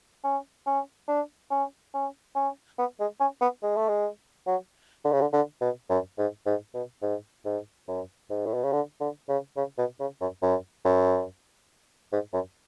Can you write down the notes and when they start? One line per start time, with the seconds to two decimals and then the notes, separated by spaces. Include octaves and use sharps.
0.24 C#4
0.67 C#4
1.08 D4
1.51 C#4
1.94 C#4
2.35 C#4
2.79 B3
3.00 G#3
3.20 C#4
3.41 B3
3.63 G#3
3.76 A3
3.89 G#3
4.47 F#3
5.05 D3
5.12 C#3
5.21 D3
5.33 D3
5.61 B2
5.90 F#2
6.18 G#2
6.46 G#2
6.74 B2
7.02 G#2
7.45 G#2
7.88 F#2
8.30 G#2
8.46 A2
8.54 B2
8.64 C#3
8.73 D3
9.00 D3
9.29 C#3
9.57 C#3
9.78 B2
10.00 C#3
10.21 F#2
10.42 F#2
10.85 F#2
12.12 G#2
12.33 F#2